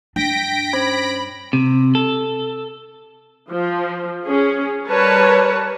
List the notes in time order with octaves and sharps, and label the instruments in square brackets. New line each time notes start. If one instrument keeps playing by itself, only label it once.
[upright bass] G2 D4 [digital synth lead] G5 [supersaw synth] A#6 B6 D7
[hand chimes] C#4 C5 G#6 [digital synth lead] B5
[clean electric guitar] C3
A4
[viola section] F3
C#4 G#4
G3 A#4 B4 C#5 A5